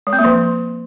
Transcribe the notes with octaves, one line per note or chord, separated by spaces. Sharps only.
G#3
C4
A#3
F3